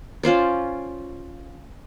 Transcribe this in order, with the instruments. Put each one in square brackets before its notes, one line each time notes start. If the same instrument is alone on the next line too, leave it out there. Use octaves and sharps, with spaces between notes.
[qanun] C#4 F4 C5 D5